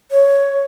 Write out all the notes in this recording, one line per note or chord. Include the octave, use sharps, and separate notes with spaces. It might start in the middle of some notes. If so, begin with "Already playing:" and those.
C#5